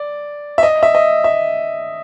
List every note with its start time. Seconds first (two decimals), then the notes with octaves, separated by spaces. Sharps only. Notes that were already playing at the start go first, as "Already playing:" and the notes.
Already playing: D5
0.58 E5
0.63 D#5
0.83 E5
0.95 D#5
1.24 E5